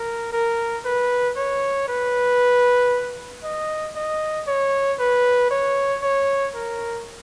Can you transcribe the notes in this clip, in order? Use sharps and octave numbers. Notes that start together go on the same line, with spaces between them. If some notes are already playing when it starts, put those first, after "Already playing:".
Already playing: A#4
A#4
B4
C#5
B4
D#5
D#5
C#5
B4
C#5
C#5
A#4